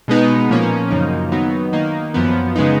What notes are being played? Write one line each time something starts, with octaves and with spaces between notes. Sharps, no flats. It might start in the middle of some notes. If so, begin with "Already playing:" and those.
B2 G#3 B3 D#4
A#2 F3 A#3 C#4
F#2 C#3 F3 A#3 D#4
D#3 F#3 B3 D#4
D#3 A#3 D#4
F#2 F3 B3
C#3 G#3 B3 D#4